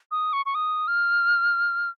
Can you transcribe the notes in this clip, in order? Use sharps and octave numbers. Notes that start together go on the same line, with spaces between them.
D#6
C#6
C#6
D#6
F6